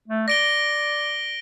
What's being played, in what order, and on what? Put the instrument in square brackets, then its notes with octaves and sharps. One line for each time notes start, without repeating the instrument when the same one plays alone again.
[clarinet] A3
[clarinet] D5 [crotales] A#6 D7 G7